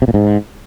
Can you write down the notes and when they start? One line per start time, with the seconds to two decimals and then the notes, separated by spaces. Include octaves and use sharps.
0.02 C3
0.08 A#2
0.14 G#2